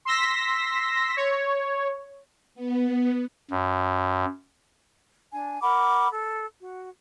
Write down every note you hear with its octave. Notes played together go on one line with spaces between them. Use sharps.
C6 E6 A#6 B6
C#5
B3
F#2
D4 G#5
A#4 F#5 B5 D6
A4
F#4